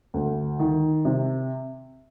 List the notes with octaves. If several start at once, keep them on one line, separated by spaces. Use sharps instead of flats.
D2
D#3
C3